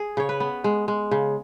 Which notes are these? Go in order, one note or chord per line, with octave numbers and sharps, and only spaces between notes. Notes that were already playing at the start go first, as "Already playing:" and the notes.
Already playing: G#4
C#3 C#5
B4
B3
G#3
G#3
C#3